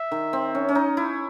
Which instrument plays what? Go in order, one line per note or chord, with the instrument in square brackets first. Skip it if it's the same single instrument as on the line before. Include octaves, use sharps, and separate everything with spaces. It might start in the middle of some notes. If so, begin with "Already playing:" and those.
Already playing: [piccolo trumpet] E5
[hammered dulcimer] D#3
C4
C#4
C#4
D#4
E4